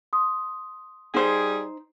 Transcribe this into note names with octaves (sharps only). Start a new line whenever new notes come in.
C6 D#6
G3 D#4 G#4 C5